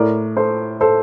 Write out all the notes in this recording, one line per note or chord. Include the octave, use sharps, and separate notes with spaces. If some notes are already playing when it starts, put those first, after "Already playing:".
Already playing: A2 A#4 D5
A4 C5
A4 C5